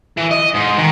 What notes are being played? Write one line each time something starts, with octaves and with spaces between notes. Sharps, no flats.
E3
D#5
G#2
D#3